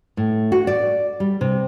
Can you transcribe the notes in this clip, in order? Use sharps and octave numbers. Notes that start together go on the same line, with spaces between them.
A2
F#4
D5
G3
C3